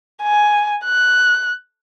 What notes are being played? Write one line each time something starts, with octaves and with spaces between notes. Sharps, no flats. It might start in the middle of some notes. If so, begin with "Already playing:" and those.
G#5
F#6